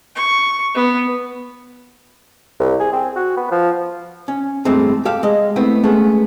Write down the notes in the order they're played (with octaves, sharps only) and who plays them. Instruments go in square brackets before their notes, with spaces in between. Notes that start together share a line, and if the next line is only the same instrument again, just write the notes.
[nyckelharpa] C#6
B3
[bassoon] C2
G#4
C4
F#4
B3
F3
[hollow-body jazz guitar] C#4
E2 G2 G#3 A3 C4
G4 A4 F5
G#3 D#5
A3 B3 C4 E4
G#3 A3 B3 C#4